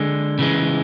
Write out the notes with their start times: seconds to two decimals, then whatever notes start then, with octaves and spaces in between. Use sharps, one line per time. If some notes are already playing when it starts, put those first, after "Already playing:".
Already playing: D3 G#3
0.39 C#3 E3 G#3